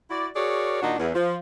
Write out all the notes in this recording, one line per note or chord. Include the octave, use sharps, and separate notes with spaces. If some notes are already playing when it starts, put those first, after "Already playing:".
E4 F#4 D5
F#4 G#4 A#4 C#5 D5
A#2 D#3 D4 D#4 F#4
E2
F3